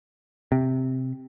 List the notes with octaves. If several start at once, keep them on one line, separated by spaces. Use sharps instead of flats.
C3